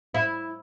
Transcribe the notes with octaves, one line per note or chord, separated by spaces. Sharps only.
E4